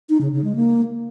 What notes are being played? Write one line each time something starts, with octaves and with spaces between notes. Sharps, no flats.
D#4
C#3
C#3
G#3
A#3